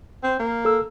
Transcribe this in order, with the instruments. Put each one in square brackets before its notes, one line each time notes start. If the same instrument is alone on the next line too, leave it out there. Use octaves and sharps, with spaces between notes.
[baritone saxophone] C4
A#3
[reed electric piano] A4 E6